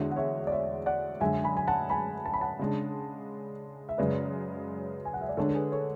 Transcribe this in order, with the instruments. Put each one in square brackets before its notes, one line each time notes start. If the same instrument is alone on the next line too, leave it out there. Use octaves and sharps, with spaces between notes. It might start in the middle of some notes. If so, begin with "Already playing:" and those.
Already playing: [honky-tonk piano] E2 D3 G#3 D4 F#4 [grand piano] C#5 E5
[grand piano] F#5
C#5 E5
D5
C#5 E5
D5 F#5
[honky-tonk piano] F#2 D3 G#3 [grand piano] E5 G#5
[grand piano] G#5 B5
G#5
F#5 A5
G#5 B5
A5
B5
F#5 A5
[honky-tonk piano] C#3 G#3 D4
[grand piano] E5
[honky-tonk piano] F#2 C#3 G#3 [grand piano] B4 D5
[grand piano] G#5
F#5
E5
D5
[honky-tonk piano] D3 G#3 D4 [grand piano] A4 C#5
[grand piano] A4
G#4 B4
A4 C#5